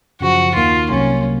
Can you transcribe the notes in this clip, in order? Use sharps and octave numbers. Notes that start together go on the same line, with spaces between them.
F#2 C#3 F3 F#4
D#2 D#3 A#3 F4
C2 C3 F#3 A#3 C#4